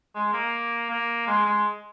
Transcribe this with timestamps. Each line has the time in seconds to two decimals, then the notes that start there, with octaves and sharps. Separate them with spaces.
0.15 G#3
0.33 A#3
0.90 A#3
1.27 G#3
1.46 G#3